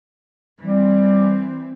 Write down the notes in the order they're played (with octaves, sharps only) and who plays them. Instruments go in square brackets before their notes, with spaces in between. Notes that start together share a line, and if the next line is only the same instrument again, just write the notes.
[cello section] E3 C4 [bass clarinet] G3